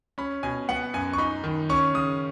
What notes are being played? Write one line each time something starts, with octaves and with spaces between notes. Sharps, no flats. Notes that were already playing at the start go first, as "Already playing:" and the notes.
C#4 B5
B2 G#5
B3 F#5
F#2 G#5
C#6
D#4 B5
D#3
C#4 C#6
C#3 D#6